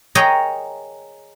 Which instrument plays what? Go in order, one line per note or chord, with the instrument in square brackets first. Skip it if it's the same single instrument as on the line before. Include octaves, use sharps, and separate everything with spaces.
[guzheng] G#4 A#4 C#5 D#5 G5 A#5